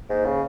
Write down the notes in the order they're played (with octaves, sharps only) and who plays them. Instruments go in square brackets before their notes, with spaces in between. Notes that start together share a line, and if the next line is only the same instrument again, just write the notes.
[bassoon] G#2 [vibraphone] A#3
[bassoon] C#3